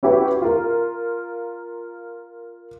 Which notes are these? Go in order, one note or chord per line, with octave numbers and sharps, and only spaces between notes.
C#4 E4 F#4 G4 B4
F4 A#4